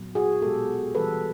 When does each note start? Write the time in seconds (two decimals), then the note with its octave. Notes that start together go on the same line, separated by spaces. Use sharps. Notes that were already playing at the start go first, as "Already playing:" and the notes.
Already playing: A#2 F#3 B3
0.15 F#4 G#4
0.42 B2 G#3 B3 G4 A4
0.95 E3 G3 B3 A4 B4